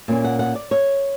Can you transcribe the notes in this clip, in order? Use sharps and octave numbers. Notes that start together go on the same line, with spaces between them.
A#2 A#3 C#4
F#5
F#5
D5
C#5